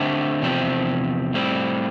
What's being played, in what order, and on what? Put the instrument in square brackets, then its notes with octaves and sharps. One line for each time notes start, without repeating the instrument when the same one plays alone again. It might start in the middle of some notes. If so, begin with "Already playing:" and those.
Already playing: [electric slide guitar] D3 A3 C4 G4
E2 C3 F3 C4 G4
A2 G3 C4